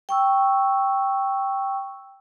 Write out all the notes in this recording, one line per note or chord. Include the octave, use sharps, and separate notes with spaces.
G5 C#6 E6